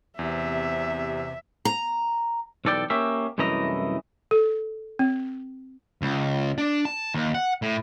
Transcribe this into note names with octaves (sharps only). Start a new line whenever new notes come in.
E2 C3 E5
A#5
B1 E2 A4 D5 G5
A#3 C#4 G4 E5
C2 F#2 E3 A3 D#5 A#5
A4
C4
C#2
D4
A5
D#2
F#5
A2